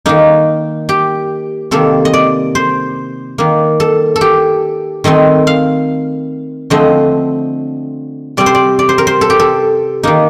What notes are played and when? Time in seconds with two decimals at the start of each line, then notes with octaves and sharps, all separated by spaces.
0.06 D#3 A#3 D#4
0.89 G4
1.71 C3 D#3 A#3 A4
2.05 D#5
2.13 D5
2.55 C5
3.38 D#3 A#3
3.80 A4
4.16 A4
4.21 G4
5.04 D#3 A3 C4 D#5
5.47 F5
6.70 D3 F3 A3 C4 D#5
8.37 C3 G3 C4 D5
8.46 C5
8.55 D5
8.79 D5
8.89 C5
8.98 A#4
9.07 C5
9.21 A4
9.30 G4
9.39 A4
10.03 D#3 A#3 D#4